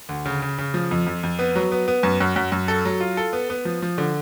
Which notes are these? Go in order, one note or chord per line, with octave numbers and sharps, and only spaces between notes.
D2
C#3
C#3
C#3
F3
F2
F2
F2
B3
F#3
B3
B3
F#2
F#2
F#2
F#2
A4
F#3
F4
A4
B3
B3
F3
F3
D3